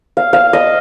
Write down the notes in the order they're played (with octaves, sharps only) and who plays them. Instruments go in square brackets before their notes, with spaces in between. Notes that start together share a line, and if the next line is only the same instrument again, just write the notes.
[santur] F5
F5
D#5